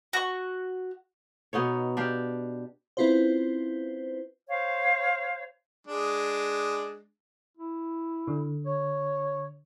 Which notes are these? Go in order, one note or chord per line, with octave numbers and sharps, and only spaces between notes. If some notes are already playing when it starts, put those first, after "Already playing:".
F#4 C#6
B2 B3 D#4 C#5
D4 G4 F5
C4 C#4 E4 F4 B4 C5
C5 C#5 F5
G#3 D4
E4
D3
C#5